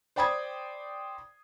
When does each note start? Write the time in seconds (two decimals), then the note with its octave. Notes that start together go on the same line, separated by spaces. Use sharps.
0.16 C5 D5 G5 B5 D#6 G#6